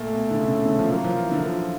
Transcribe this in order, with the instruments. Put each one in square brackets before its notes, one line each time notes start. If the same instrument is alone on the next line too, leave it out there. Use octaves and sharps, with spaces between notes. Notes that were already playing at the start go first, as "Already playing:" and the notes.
Already playing: [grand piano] A#2 [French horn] A3
[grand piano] B2
D3
C#3
C#3
D3
F3
[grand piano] F#3 [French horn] A#3
[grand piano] F3
E3
D3
[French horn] F3